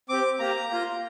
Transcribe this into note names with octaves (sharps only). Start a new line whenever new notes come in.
C4 G4 D6
A#3 G4 A#5
A#3 F4